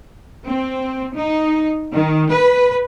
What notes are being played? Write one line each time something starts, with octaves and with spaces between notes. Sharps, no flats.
C4
D#4
D#3
B4